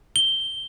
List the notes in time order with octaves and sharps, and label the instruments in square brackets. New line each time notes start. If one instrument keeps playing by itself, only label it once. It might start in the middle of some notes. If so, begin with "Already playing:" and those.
[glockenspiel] G7